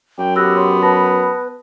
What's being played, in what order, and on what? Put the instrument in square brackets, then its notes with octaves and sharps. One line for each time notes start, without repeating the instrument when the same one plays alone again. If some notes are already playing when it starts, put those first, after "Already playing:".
[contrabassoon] F#2 [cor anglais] G5
[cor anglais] B3 [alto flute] G4 [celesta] E6 F#6 A#6
[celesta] C#5 C6
[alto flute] B4 [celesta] A5 B5 A#6